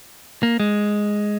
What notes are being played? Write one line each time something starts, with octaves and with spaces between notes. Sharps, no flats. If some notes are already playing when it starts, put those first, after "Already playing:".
A#3
G#3